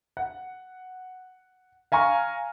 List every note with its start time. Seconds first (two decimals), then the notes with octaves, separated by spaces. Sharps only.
0.17 F#5
1.92 F5 G#5 A#5 C#6 F6